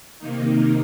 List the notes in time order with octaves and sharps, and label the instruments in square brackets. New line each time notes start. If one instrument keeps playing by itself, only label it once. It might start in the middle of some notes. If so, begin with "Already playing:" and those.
[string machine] C3 D#3 A#3 D#4